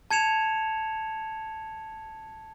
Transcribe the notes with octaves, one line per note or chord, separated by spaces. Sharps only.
A5 G#6 C#7 E7 F7